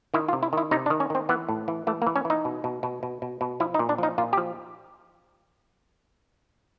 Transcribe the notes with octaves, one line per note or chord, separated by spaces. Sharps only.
D#3 E4
F4
C3
E4
D#3 E4
C3 D#4
D4
D#3
C#4
D#3 C4
E3 B3
A2
E3
E3 A3
A#3
E3
C#4
E3 D#4
B2
B2
B2
B2
B2
B2
F3 E4
D#4
A#2
D4
F3 D#4
A#2 F4
G4
F3